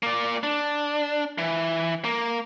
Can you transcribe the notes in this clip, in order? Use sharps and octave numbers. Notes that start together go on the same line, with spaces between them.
A#3 D5
D4
E3
A#3